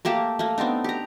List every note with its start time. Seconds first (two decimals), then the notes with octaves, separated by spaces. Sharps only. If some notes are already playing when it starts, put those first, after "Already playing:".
0.05 A3 A#3 G4 A5
0.39 A3 A#3
0.58 B3 C4 D4 D#4
0.84 G4 A#5